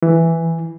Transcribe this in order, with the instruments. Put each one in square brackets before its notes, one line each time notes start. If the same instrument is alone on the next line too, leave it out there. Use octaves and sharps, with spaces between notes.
[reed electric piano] E3